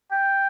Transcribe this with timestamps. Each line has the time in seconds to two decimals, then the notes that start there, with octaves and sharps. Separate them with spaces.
0.11 G5